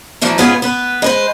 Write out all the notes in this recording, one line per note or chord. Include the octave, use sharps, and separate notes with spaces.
D2 E3 F3 E4 A#5
G#2 C#3 B3 F4 G#4
B3 B4
G#3 B4 C5